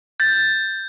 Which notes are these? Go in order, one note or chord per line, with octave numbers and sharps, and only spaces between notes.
G6 A6